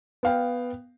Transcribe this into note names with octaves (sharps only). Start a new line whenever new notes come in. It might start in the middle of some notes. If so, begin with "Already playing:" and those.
B3 F5 G5